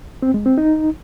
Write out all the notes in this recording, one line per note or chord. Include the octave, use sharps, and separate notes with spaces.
C4
G#3
C4
D#4